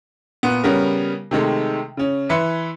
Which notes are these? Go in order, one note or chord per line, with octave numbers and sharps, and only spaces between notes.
A#2 B3
C#3 G3 B3 C#4 A#4
C3 D#3 G#3 A3
C#3 C#4
E3 B4 E5 C6 C#7